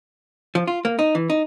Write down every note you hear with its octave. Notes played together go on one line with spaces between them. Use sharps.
F3
F4
A#3
D#4
E3
D#4